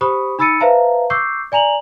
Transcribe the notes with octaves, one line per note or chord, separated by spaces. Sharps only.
G4 C5 B5 C#6 D#6
D#4 B5 E6 A6 C#7 D#7
B4 C5 E5 F5 A5 A#5
C#6 D6 E6 G6 C7
D5 G#5 A#5 F7 F#7